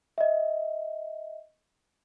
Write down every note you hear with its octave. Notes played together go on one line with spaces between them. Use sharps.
D#5 E5